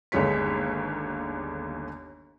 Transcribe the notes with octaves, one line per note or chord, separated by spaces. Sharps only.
G1 D#2 D3 G#3 C#5 B6